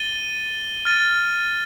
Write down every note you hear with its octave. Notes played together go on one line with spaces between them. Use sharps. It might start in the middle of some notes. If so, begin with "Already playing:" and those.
Already playing: A6 D#7 G7
F6 A6 D#7